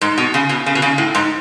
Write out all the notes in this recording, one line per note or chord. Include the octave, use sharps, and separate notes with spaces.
G#2
B2
C#3
B2
C#3
B2
C#3
A2
G#2